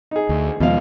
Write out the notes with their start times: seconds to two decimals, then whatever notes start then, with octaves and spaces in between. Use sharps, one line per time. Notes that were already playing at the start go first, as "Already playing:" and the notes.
0.11 D#4 G#4
0.29 D2
0.60 D#2 B2 F3 G#3 F5